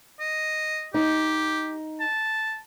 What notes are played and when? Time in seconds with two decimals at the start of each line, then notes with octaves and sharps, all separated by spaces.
0.20 D#5
0.94 D#4 G4
2.00 A5